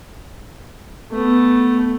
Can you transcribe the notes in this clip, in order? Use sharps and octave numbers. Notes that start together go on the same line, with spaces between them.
A3 B3